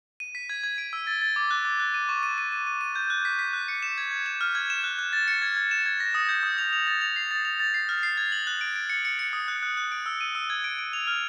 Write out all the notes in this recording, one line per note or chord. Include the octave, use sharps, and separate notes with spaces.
D#7
B6
G#6
G#6
D7
E6
A6
A6
D6
F#6
D6
F#6
D#7
C#6
D#7
D#7
D#7
D#7
D#7
G6
F#6
B6
B6
F#6
C#7
E7
G#6
G#6
E7
F6
G#6
E7
F#6
F#6
A6
C#7
G#6
G#6
E7
G#6
A#6
D#6
G6
D#6
F7
F7
A6
F7
C7
A6
F7
A6
C7
F6
C7
G#6
F#7
F#6
D7
D7
C#7
C#7
C#7
D#6
F#6
F#6
F#6
D7
E6
D#7
E6
G#6
D7
D7
F7
F6